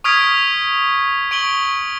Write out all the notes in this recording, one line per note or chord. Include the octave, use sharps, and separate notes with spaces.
C#6 D#6 F6 G#6 B6 D7
C#6 D7 F#7 G7